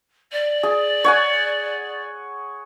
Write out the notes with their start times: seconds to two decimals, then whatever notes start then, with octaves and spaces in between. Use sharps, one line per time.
0.32 D5
0.63 G#4
1.04 C#5 F#5 G#5